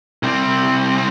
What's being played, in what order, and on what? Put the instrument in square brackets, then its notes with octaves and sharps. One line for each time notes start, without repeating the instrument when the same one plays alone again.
[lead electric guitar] C2 C4